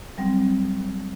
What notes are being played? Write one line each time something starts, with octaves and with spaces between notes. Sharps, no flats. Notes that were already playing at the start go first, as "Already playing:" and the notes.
F#3 G3 C4